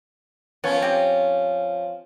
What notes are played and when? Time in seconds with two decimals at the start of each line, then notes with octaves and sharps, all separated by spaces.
0.64 F3 B3 C#4 C#5
0.82 C4 G4